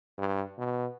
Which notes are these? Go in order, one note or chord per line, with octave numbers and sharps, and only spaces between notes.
G2
B2